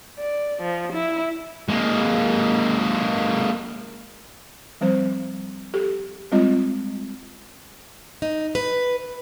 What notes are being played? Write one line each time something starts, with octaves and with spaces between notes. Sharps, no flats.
D5
F3
E4
G#3 A#3
F3 G3 C4 C5
G4 A4
G3 G#3 C4 F4 D#5
D#4
B4